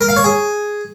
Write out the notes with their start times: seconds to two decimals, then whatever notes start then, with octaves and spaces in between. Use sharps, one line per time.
0.01 A#4
0.09 F5
0.16 C#5
0.24 G#4